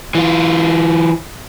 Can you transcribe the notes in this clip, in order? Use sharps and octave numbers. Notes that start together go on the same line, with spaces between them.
E3 F4